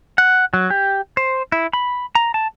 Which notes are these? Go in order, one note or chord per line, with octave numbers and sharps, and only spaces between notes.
F#5
F#3
G4
C5
E4
B5
A#5
A5